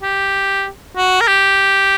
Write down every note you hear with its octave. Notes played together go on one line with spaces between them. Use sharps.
G4
F#4
A#4
G4